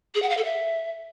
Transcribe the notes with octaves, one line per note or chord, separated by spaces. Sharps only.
G#4
F#5
F5
A4
E5